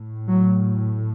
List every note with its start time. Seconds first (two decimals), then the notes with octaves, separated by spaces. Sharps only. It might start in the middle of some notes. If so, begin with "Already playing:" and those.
Already playing: A2
0.29 F#3